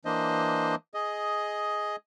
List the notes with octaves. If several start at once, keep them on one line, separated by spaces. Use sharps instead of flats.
E3 A#3 D4 C5 D#5
G#4 D#5